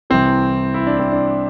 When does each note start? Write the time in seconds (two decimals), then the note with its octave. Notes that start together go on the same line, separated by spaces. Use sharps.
0.10 C2 C3 E3 C4
0.74 E4
0.87 D4
0.99 C4
1.12 D4